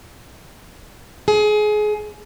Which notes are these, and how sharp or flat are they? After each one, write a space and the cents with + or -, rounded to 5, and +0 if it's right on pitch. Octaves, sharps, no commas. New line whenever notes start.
G#4 +25